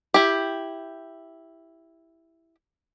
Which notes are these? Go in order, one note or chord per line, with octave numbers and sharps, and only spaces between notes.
E4 G4